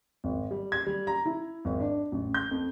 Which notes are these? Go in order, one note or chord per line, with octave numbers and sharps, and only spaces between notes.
G#1
G3
G#6
G3
A#5
E4
G#1
D4
A1
G6
F2